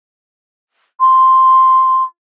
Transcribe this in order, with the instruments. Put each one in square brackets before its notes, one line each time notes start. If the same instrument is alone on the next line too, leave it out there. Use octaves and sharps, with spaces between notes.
[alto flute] C6